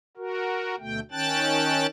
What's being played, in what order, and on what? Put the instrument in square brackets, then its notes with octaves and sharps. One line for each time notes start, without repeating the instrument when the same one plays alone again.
[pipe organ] F#4 A#4
D2 B2 A3 G5
D#3 C#4 G5 A5 F#6 A6